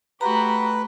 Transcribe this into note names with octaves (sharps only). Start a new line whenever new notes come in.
A3 F#4 G4 B4 A#5